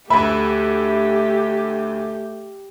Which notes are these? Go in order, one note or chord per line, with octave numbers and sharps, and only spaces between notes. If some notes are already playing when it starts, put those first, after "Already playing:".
D2 A3 G4 B4 E5 B5